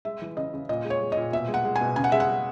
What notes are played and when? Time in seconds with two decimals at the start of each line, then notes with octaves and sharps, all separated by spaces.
0.05 G#3 E5
0.22 E3
0.37 C#3 D#5
0.54 C#3
0.69 A#2 D#5
0.85 G#3
0.90 C#5
1.01 G#3
1.12 A#2 D#5
1.33 B2 E5
1.48 G#3
1.54 F#5
1.65 G#3
1.76 G#5
1.81 B2
1.96 C#3 G#5
2.04 F#5
2.12 G#3 E5
2.20 F#5
2.29 G#3